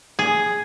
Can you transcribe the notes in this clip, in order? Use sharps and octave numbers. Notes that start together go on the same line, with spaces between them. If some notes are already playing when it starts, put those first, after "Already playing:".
G#4